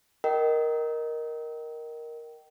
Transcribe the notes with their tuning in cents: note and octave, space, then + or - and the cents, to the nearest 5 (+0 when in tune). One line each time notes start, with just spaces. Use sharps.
A#4 +5 D#5 +0 G5 -25